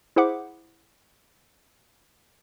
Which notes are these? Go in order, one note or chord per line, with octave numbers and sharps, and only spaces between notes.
E4 G#4 C5 E5 F#5 D6